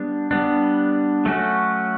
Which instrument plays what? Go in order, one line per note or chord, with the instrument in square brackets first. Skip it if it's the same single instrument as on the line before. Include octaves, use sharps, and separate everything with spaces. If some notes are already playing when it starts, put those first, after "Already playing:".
Already playing: [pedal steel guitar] G3 B3 D4
G3 B3 D4
F#3 A3 C#4 F#4